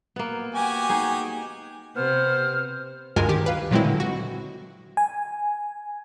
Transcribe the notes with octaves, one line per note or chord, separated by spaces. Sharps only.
A#3 B3
F#4 G4 G#5
D#4 G#4
C3 B3 C5 F6
D2 G2 G#3 F4 A#4 G#5
D#3 G4
B4 F5
A#2 F#3 G#3 C4 E4
D3
F#4
G#5